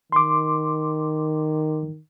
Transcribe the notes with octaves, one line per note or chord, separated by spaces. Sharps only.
D#3 C6 D6